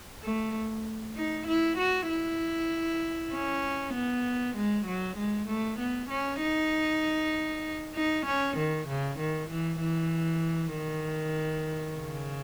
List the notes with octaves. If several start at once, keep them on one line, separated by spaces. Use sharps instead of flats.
A3
D#4
E4
F#4
E4
C#4
B3
G#3
F#3
G#3
A3
B3
C#4
D#4
D#4
C#4
D#3
C#3
D#3
E3
E3
D#3
C#3